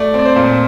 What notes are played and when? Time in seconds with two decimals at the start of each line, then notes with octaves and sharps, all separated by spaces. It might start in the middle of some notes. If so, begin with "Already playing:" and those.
Already playing: A3 D5
0.14 C4
0.19 D5
0.25 C5
0.36 A#2